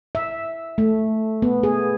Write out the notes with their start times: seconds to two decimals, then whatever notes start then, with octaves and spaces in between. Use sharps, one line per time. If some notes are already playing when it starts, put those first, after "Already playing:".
0.15 E5
0.78 A3
1.42 B3
1.63 G#4